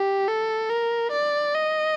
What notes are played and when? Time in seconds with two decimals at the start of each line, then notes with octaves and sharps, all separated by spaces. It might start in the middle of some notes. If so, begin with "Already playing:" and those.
Already playing: G4
0.28 A4
0.70 A#4
1.12 D5
1.55 D#5